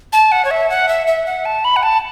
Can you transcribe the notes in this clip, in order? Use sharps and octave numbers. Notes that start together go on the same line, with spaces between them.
A5
F#5
C#5
E5
F#5
E5
E5
F#5
A5
B5
F#5
A5